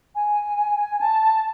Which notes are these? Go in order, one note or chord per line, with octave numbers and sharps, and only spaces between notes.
G#5
A5